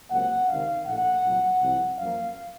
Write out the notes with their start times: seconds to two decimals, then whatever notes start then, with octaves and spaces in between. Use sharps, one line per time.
0.10 C#2 C3 F#3 A#3 F#5
0.48 C#2 C3 D#3 F5
0.86 A#1 A2 A3 F#5
1.23 C2 A#2 F#3
1.61 C2 C3 F3
1.99 F#2 F3 A#3 F5